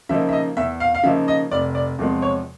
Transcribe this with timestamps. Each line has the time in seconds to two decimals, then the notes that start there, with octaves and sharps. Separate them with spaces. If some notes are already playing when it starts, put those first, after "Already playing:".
0.09 C#3 F3 A#3 D#4 E5
0.29 E5
0.33 D#5
0.57 E2 E5
0.80 F5
0.95 F5
1.04 C#3 F3 A#3 D#4 E5
1.28 D#5
1.51 F1 D5
1.75 D5
1.99 E2 C3 F3 G#3
2.22 C#5